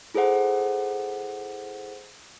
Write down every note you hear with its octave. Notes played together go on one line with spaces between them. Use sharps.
E4 G#4 A4 C5 F#5